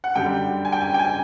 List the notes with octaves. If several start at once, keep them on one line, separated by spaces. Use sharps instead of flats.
F#5
F#2 D3 G3 G5
G#5
G5
G#5
G5
G#5